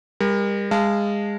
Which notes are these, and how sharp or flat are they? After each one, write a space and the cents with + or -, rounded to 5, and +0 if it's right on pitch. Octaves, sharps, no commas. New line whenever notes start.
G3 +40 A#4 +20
G#3 -25 F5 -25 A5 +0